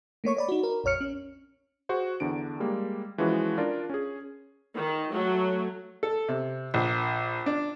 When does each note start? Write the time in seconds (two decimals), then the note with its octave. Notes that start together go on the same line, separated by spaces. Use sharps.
0.24 A3 A#3 C#5 C#6
0.37 C#5 D5 B5
0.49 D#4 F#4
0.63 A#4
0.84 A#1 F2 C#5 F6 C#7
1.01 C#4
1.89 F#4 G#4 C5
2.20 E2 D3 D4 D7
2.60 G3 G#3 A#3
3.18 E3 F3 G#3 C#4 F#4 B4
3.58 D4 F4 A#4 D5
3.90 C#4 G#4
4.74 D#3
5.11 F#3 A3
6.03 A4
6.29 C3
6.74 A#1
7.46 D4